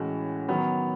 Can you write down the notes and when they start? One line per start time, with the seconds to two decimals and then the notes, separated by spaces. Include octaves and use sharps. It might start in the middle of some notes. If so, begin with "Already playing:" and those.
Already playing: A2 E3 G#3 C#4 F#4
0.48 D#3 F#3 B3